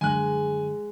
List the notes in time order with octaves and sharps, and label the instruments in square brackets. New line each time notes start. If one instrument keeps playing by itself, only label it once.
[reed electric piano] F#2 D3 [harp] G#3 [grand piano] G#5 F#6